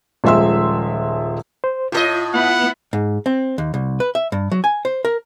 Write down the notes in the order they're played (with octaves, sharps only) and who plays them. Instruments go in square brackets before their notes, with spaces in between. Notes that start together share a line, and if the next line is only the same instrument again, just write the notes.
[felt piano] D#1 F3 G#3 E5 C6 E6
[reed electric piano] C5
[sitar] A2 A4 D#5 [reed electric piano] F4
[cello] B3 E4 [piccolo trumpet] F#5
[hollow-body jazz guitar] G#2
C4
D#2
C2
B4
E5
G2
F#3
G#5
C5
A#4